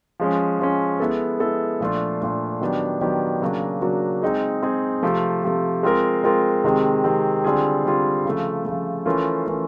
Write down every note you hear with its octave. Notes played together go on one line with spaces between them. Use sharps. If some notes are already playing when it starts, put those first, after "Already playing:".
F3 G#3 C#4
F3 G#3 C#4
G#3 B3 E4 A4
G#3 B3 E4 A4
A#2 F3 A3 D4 F4
A#2 F3 A3 D4 F4
D#3 F#3 B3 D4 G4
D#3 F#3 B3 D4 G4
C#3 F#3 A#3 D4 F#4
C#3 F#3 A#3 D4 F#4
G#3 C4 D#4 G#4
G#3 C4 D#4 G#4
C3 F3 A3
C3 F3 A3
G#3 C4 F4 A#4
G#3 C4 F4 A#4
C3 D#3 G#3 C4
C3 D#3 G#3 C4
D3 G3 C4 F4 G#4
D3 G3 C4 F4 G#4
C#3 F3 A3
C#3 F3 A3
E3 A3 C#4 F4 A#4
E3 A3 C#4 F4 A#4